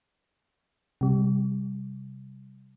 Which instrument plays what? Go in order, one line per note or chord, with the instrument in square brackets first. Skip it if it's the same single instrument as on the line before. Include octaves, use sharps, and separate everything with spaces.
[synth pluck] C3 G3